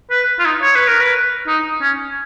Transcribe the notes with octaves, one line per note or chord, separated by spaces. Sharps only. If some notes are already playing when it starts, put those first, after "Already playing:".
B4
F4
D#4
C#5
B4
A#4
B4
D#4
C#4